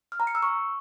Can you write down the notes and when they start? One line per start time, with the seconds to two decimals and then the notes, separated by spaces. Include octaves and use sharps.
0.12 F6
0.20 A#5
0.27 C#7
0.35 E6
0.42 C#6